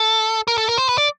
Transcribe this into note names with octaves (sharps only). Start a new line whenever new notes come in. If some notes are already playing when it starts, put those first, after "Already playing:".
Already playing: A4
A#4
A4
A#4
C5
B4
D5